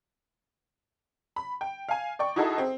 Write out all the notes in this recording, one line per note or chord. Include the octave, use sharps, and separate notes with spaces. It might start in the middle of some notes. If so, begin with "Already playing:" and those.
B5
G5
F5 G#5
D5 G5 C#6
D#4 E4 F#4 G#4 A4 D#5
C4